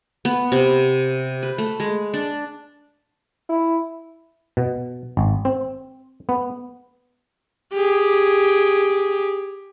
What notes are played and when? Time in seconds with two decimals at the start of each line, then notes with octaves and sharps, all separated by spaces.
0.25 B3
0.52 C3
1.43 B4
1.58 A3
1.80 G#3
2.14 D4
3.49 E4
4.57 B2
5.17 G#1
5.45 C4
6.29 B3
7.73 G4 G#4